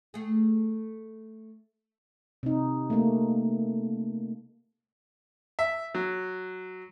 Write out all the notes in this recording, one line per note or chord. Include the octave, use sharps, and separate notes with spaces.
A3 G#4
C3 D#4
A3 A#3
E5
F#3